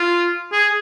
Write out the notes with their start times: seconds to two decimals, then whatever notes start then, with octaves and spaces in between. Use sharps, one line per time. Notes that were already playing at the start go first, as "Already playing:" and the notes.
Already playing: F4
0.52 G#4